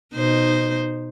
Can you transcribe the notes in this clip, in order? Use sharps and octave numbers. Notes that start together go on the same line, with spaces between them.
B2 D#4 C5